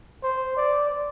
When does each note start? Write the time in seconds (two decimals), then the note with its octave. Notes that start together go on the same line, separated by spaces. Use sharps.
0.23 C5
0.57 D5